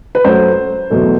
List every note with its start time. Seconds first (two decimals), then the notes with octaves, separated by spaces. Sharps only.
0.15 B4
0.24 F#2 F#3 A3 C5
0.90 E2 B2 F#3 A3